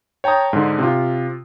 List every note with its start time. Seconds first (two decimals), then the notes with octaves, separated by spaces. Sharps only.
0.24 C#5 G5 A5 A#5 D#6
0.53 G#2 D3
0.79 C3 F4